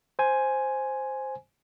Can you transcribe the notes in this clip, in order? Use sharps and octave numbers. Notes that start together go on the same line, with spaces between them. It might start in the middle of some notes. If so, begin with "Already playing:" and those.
C5 G#5